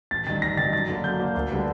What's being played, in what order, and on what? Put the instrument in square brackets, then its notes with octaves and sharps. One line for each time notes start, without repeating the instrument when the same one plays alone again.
[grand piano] A1 A6
G2 D#3 A6
A1 A#6
G2 D#3 A6
F#2 A6
D3 F#3 A#3
F#2 G6
D3 F#3 A#3
D2
D3 G3 B3